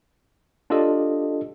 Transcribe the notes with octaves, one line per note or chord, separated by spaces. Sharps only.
D4 F4 G4 A4 D#5